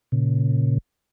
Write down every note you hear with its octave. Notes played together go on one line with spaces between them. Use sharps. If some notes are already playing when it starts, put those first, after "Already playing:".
A#2 C#3